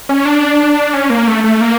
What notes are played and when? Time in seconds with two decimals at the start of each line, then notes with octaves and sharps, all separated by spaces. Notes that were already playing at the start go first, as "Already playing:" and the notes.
0.09 C#4
0.25 D4
0.93 C#4
1.10 A#3
1.27 A3
1.44 A3
1.61 A#3